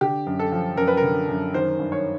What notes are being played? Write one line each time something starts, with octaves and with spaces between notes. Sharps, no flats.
D3 G4
F#2
A4
F3
F#2 A#4
B4
A#4
D3
F#2
D#3 C5
G2
C#5